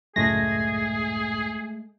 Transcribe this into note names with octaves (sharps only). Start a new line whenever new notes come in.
C#2 F#2 A2 G#3 A3 G#4 A#6